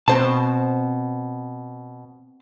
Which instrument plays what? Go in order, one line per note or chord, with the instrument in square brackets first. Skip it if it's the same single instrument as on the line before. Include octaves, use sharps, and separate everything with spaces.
[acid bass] B2 [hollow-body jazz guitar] C4 C5 A5